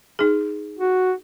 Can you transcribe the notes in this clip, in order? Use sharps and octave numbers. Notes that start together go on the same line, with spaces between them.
D#4 G#4
F#4